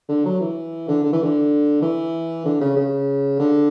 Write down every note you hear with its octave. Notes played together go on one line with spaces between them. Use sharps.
D3
F#3
E3
D3
D3
E3
D3
E3
D3
C#3
C#3
D3